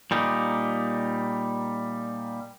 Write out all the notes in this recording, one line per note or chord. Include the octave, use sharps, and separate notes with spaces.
A#2 G3 D#4